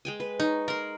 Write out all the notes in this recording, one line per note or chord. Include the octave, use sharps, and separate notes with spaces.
G#3 G5 G#5
B4
D#4 C#5
A#4 B5 C6